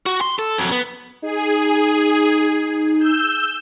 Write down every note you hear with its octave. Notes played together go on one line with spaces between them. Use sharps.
F#4
C6
A4
F2 F#3
B3
D#4 G#4
E6 G6